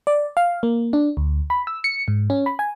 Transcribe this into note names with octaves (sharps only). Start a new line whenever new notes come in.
D5
F5
A#3
D4
D2
B5
E6
C#7
G#2
C#4
B5
G#5